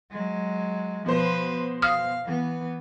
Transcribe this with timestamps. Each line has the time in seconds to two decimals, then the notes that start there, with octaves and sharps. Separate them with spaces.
0.11 F#3 G#3
1.06 B2 F3 B4 C5
1.82 F5 D#6 F6
2.24 E3 B3